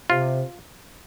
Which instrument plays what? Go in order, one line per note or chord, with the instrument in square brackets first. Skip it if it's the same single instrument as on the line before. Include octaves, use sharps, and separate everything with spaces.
[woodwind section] C3 [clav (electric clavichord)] F4